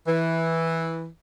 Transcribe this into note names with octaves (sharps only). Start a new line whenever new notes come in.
E3